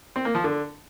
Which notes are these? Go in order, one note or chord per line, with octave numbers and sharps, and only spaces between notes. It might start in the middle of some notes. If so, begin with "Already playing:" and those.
C4
A#3
F3
D3